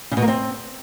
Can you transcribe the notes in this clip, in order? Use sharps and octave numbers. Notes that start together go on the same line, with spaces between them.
C#3
B2
A#3
C4